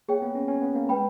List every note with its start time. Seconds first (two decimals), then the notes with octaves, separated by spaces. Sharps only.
0.08 A#3 G#4 C#5 G5
0.22 B3
0.35 C#4
0.48 C#4
0.62 B3
0.75 A#3
0.89 G#3 B4 G5 B5